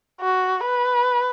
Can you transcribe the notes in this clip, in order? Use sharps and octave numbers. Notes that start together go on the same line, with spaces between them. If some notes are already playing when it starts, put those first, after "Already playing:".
F#4
B4